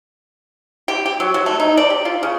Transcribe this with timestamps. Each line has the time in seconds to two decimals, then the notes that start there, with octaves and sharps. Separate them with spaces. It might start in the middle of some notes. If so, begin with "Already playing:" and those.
0.88 G4
1.06 G4
1.20 F#3
1.34 F#3
1.46 A3
1.60 D#4
1.77 D5
1.90 G4
2.05 F4
2.23 C#3